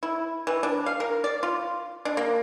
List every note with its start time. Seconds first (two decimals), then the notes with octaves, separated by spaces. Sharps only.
0.03 E4
0.47 E3
0.63 D4
0.86 F5
1.00 A#4
1.24 D5
1.43 F4
2.05 D4
2.17 A#3